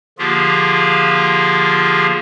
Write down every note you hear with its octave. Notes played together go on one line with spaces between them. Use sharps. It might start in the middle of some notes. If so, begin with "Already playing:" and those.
D3 F3 A#3 F4 G4 G#4